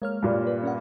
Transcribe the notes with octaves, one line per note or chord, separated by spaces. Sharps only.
G#3 A#3 C#5 F6
G2 A#2 G3
B4
C#4 A#4 F#5